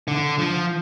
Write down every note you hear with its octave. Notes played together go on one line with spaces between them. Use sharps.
D3
F3